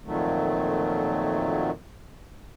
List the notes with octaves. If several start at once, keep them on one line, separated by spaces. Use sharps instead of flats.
F2 A#2 D#3 F#3 A3